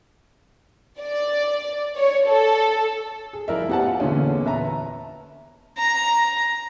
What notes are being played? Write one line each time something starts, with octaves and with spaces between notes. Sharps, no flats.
D5
C#5
A4
G#4
F3 E4 A#4 D5 E5
B3 G4 C5 F#5 G#5 A5
F4
E2 A#2 D3 B3 C#4
B4 E5 A5 A#5
A#5